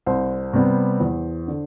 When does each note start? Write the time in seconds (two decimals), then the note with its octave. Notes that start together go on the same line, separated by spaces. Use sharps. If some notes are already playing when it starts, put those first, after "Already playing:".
0.06 C2 C5
0.53 C3 G3 B3
1.00 E2
1.48 D3